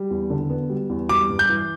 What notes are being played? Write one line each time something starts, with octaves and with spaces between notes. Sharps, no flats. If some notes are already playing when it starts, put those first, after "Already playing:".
Already playing: G3
E2
D3
B3
G3
E2
G3 D6
G2
G6
E3